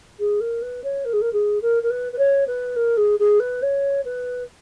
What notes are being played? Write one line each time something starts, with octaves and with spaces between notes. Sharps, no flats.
G#4
A#4
B4
C#5
A#4
G#4
A#4
G#4
A#4
A#4
B4
B4
C#5
B4
A#4
G#4
G#4
B4
C#5
B4